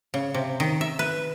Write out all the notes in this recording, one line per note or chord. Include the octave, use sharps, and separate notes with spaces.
C#3
C3
D#3
E5
B4